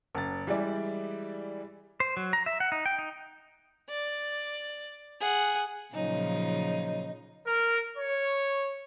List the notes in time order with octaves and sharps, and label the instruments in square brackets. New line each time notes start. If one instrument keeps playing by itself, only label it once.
[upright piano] F#1 A6
E3 G3 G#3 E4 D5
[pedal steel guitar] C5
F#3
A#5
E5
F#5
D#4
G5
D#4
[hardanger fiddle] D5
G#4 F#5
[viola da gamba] A#2 C#3 F3 [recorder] F#3 [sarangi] D#4
[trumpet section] A#4
C#5